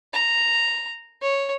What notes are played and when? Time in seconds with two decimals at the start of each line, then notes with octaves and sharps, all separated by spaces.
0.13 A#5
1.22 C#5